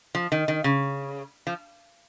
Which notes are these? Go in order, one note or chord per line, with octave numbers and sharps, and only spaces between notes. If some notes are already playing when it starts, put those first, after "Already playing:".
F3
D#3
D#3
C#3
F3